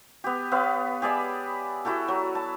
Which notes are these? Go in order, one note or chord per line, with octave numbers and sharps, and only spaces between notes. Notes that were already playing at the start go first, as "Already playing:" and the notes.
B3 G4
B3 B4 C#5 F5
G4 G#4 D5 E5
E4 F#4 G4 A4
F#3
A5